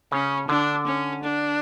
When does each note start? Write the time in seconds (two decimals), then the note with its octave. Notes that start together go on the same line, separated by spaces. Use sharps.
0.12 C#3 C#4
0.49 D3 D4
0.87 C#4
1.23 D4